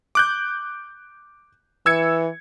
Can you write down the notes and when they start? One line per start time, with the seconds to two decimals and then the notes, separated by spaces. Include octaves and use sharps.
0.15 D6 F#6 G6
1.86 E3 E6 G#6 C#7